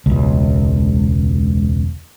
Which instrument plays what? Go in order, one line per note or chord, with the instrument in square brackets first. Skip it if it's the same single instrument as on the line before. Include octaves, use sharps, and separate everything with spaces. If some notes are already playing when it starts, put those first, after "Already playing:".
[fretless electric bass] E1 C#2